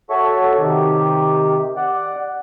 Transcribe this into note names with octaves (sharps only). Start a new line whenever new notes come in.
F#4 A4 C#5 E5 C#6
C3 D#3 G4
D5 F#5